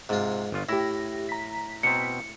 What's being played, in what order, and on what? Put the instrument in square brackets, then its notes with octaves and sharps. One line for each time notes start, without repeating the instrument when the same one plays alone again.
[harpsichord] G#2 F4 [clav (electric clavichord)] C3
[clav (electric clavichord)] G1 F4
[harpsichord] A2 [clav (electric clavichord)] E4 [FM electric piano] G4 A#6
[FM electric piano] A#5 B6
[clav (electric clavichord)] B2 C4 [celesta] C#7